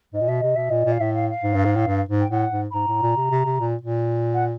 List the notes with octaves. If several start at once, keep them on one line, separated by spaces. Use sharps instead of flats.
G#2 D#5
A#2
B2 E5
C3 D#5
B2 E5
A#2 D#5
A#2
F5
A2 E5
F5
F5
G#2
G2
G#2
A2
G2
G#2
G5
A2 F#5
G#2
B5
G#2 A#5
A2
A#2
C3
C3
C3
A#2
A#2
F#5